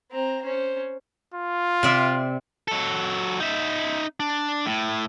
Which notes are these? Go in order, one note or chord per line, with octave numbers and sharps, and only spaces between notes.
C4 A#5
C#4 C5
F4
C3 D5 E5
F#3 A4
D#4 E5
D4
A2